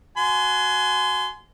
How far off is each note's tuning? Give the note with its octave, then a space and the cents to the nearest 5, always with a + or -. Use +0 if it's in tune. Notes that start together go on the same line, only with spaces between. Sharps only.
F#4 +0 G#5 +25 C6 -25